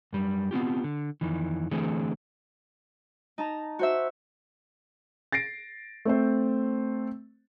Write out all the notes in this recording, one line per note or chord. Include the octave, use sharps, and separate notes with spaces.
F#2 G3
B3 C4 F4 G4
D3
F2 D#3 E3
D3 E3 A3 C4 G#4 A4
D#4 A5 A#5
F#4 C5 E5
A6 A#6 C7 D7
A3 C4 C5